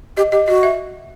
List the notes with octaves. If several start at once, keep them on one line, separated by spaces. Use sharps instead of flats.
G4 D#5
G4 D#5
F#4 D#5
E5